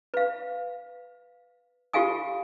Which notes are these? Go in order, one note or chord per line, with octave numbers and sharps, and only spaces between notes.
B4 F5
F4 G4 A4 F5 G#5 D#6